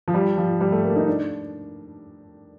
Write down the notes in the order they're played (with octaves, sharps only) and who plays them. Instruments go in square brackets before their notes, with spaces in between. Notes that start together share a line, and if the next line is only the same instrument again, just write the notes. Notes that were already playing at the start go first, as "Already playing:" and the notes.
[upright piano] F3
G3
F3
G3
A3
A#3
D#4
D4